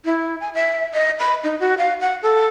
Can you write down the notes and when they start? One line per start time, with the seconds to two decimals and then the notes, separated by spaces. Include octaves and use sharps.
0.05 E4
0.40 G#5
0.54 E5
0.94 D#5
1.19 B5
1.44 D#4
1.60 F#4
1.78 F5
2.01 F#5
2.23 A4